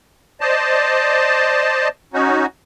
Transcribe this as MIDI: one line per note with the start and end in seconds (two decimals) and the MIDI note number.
0.41 1.88 72
0.41 1.88 74
0.41 1.88 75
0.41 1.88 81
2.14 2.46 61
2.14 2.46 63
2.14 2.46 66